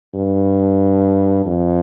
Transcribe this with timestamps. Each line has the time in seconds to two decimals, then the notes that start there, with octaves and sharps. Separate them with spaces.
0.14 G2
1.46 F2